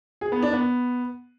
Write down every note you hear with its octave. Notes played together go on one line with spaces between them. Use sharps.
G#4
B3
D4
B3